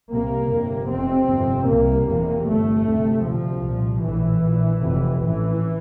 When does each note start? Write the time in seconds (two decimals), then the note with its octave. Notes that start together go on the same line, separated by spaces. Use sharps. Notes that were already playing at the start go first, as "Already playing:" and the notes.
0.11 C2 C3 A#3
0.50 G1 F2 C3
0.89 F1 F2 C3 C4
1.28 G1 F2 C3
1.68 C2 C3 A#3
2.06 F1 E2 C3
2.46 G1 G2 A3
2.86 D2 C3
3.25 D2 C3 F3
3.63 C2 A#2
4.03 A#1 A2 E3
4.42 A#1 A#2
4.82 F1 F2 C3
5.20 A1 A2 E3